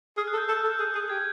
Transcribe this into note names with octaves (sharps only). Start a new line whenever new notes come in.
G#4 F6
F#6
A4
G6
A4 G6
A4
G#4
G#4
G4 G#6